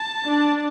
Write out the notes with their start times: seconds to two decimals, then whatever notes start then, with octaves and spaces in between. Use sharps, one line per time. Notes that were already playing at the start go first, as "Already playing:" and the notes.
Already playing: A5
0.25 D4